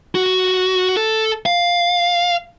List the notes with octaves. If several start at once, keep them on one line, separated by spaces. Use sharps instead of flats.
F#4
A4
F5